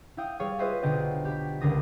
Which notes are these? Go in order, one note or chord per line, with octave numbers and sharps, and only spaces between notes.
E4 F5 G5 D#6
G3 G#4 C#5 F5
F4 G#4 B4 C5 D#5 E5
B1 D3 G4 D#5 G5
G4 B5
C#2 D3 D4 A#4 D#6 A#6